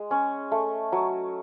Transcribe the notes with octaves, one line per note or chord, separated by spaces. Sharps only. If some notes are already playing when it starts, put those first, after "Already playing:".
Already playing: G#3
C#4
A3
F#3